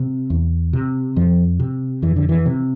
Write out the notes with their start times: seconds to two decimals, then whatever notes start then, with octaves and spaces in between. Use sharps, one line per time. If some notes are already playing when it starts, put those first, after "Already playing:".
Already playing: C3
0.30 E2
0.73 C3
1.16 F2 F3
1.60 C3
2.02 F2 E3
2.16 D3
2.29 E3
2.46 C3